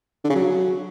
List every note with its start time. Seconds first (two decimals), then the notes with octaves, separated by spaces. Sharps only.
0.24 D3
0.30 C#3
0.35 F#3